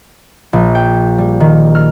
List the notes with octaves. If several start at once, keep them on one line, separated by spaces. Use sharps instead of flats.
A#1
G5
G3
D#3
F6